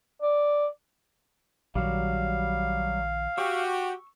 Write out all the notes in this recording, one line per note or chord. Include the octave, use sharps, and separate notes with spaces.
D5
A#1 D#3 F#3 G3 F5
F#4 G4 C#6 E6